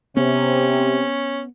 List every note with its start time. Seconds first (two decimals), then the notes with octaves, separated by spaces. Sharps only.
0.17 C3 B3 C#4